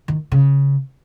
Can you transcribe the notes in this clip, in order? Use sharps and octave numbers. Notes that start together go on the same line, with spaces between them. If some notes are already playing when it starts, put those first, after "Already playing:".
D#3
C#3